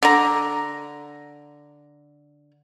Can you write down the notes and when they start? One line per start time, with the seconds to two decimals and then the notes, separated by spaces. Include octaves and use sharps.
0.03 D3 A#5